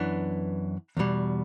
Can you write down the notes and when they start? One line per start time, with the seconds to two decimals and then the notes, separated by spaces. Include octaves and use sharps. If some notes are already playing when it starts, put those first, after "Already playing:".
Already playing: F#2 E3 B3 D4
0.97 E2 B2 G3